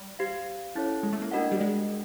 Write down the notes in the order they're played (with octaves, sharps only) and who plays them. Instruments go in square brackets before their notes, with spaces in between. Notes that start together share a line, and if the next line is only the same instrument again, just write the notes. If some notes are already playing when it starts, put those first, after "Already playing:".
Already playing: [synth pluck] G3
[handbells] G4 C5 F5
C#4 E4 A4 C#5
[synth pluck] G#3
A3
A#3
[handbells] D4 F#4 A#4 D#5 F#5
[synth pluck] G3
G#3
[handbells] D4